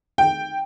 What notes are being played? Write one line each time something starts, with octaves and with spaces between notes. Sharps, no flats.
G5